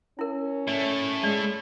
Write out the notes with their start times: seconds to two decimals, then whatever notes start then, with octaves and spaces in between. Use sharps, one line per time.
0.19 C#4 E4 A#4
0.68 A3 E4 D5
1.24 G#3 D5